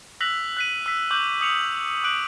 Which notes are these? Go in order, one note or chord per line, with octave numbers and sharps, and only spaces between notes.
E6 F#6 A#6 B6 F7 F#7
F#6 B6 D#7
E6 B6
C#6 D6 F#6 G6 F#7
D#6 C#7 F7
D6 F#6 D7 F#7